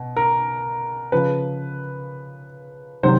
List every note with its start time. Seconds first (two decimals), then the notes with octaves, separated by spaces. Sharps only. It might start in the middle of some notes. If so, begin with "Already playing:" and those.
Already playing: B2
0.17 A#4
1.12 C#3 F3 B4
3.03 C3 D#3 F#3 C5